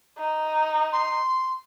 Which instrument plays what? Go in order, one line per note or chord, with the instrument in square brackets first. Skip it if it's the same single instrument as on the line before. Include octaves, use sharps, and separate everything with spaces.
[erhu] D#4
[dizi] C6